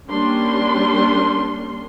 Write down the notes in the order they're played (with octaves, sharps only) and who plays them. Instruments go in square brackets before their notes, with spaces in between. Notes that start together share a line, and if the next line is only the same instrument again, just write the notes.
[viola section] G3 A#3 C#4 D4 C6